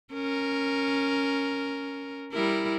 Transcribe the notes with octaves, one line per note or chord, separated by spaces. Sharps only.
C#4 A#4
G3 E4 A#4